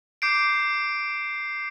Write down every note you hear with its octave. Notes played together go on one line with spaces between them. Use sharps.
D6 G6 C7 D7